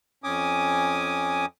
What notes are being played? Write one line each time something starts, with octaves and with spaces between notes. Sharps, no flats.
F2 C#4 G#5 D6 D#6